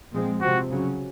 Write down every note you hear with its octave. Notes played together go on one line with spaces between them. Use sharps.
A#2 F3 G#3 C4
C3 F3 C4 F#4
C#3 F#3 C#4